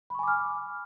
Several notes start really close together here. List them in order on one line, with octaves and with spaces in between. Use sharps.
B5 C#6 G#5 D6 F6